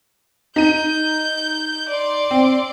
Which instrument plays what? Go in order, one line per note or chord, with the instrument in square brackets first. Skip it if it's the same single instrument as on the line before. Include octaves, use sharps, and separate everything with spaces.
[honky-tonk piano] D#4 D#7 [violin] G6
[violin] D5 C6
[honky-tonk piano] C4